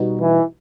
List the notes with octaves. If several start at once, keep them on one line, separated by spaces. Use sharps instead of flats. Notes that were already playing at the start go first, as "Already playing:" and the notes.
Already playing: B2 G3 B3 D#4 F#4
E3